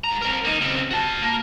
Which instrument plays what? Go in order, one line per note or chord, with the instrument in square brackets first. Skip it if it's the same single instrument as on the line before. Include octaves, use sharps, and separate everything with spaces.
[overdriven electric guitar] G#2 A#5
C4 A#4
A#3 D#4
C#3 C4
F#4 A5
A#3